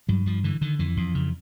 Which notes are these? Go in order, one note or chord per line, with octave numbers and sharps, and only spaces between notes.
G2 F#3
G2 F3
D3 E3
D3 D#3
F2 E3
F2
C#3